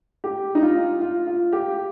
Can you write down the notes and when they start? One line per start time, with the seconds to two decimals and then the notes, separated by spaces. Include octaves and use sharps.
0.24 G4
0.55 D#4
0.62 F4
1.01 F4
1.27 F4
1.53 G4